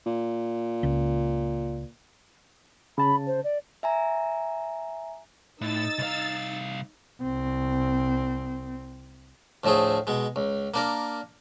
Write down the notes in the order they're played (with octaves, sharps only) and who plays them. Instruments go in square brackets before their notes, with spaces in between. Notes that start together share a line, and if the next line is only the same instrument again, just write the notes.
[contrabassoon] A#2
[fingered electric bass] C#2
[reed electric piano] C#3 A5 [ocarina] B5
[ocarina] C5
D5
[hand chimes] E5 G#5 A#5
[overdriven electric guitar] A2 [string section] D#4 E6 A6
[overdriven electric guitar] C2 F5
[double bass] C2 C4
[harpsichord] D2 A2 F3 A3 G#4
B2 G#3
C#2
A#3 D4 A#4